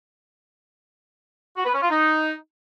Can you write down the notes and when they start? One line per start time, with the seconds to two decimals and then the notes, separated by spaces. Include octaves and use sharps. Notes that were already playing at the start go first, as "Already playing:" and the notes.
1.56 F#4
1.65 B4
1.73 C#4
1.82 F4
1.90 D#4